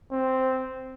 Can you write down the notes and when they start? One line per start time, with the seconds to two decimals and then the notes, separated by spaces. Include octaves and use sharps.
0.12 C4